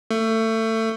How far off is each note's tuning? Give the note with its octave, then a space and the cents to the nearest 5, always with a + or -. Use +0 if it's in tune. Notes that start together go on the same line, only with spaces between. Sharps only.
A3 +25